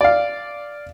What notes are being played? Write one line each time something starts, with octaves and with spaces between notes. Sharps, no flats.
D5 F5